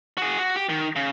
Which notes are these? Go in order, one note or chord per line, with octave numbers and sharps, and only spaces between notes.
F#4 G#4
F#4
G4
D#3
C#3